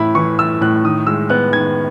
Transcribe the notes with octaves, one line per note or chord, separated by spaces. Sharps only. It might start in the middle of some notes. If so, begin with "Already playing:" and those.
Already playing: A2 E3 A3 E4 B5
E3 C#6
A3 E6
A2 F#6
D#3 D#6
G#3 E6
B3 F#6
D#3 G#6